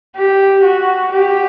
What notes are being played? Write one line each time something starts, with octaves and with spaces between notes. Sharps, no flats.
G4
F#4
G4